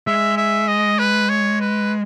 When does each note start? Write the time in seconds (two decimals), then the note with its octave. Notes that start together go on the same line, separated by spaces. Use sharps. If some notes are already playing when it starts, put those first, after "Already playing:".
0.07 G#3 E5
0.37 E5
0.68 D#5
0.99 B4
1.29 C#5
1.61 B4